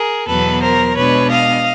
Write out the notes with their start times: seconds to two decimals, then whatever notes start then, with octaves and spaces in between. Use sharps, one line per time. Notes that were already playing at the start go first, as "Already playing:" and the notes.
Already playing: G#4 A#4
0.28 E2 B2 F#3 B3 A4 B4
0.61 A#4 C5
0.96 B2 G#3 B3 D4 B4 C#5
1.30 D#5 F5